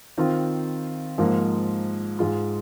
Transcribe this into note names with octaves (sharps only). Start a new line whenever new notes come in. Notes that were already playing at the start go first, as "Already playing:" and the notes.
D#3 C4 F4
G#2 F3 A#3
G#2 G#3 F4